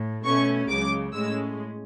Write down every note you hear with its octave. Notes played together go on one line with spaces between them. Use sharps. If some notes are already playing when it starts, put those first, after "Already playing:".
Already playing: A2
B2 A3 C#4 C#6
C#2 C#3 F#3 D6
A2 G#3 C#4 E6